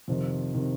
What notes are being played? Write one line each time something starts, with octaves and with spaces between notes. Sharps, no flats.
F2 C3 D#3
C3 D#3